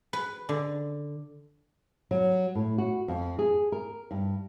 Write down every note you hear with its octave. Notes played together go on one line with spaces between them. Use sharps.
B4
D3
F#3
A2
F#4
F2
G#4
A#4
G2